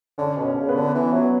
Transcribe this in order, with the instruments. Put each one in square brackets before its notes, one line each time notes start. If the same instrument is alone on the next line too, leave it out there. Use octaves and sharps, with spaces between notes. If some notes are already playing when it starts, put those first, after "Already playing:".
[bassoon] D3 [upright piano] C#4 C#5
[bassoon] B2
[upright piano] C#4 C#5
[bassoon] C#3
[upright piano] B3 B4
[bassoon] D3
E3
F#3